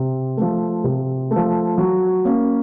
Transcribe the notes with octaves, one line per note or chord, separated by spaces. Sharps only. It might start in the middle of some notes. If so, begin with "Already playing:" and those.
Already playing: C3
F3 A3
C3
A3
F3
F#3
A#3 C#4